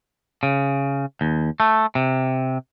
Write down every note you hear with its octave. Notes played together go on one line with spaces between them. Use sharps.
C#3
D#2
A3
C3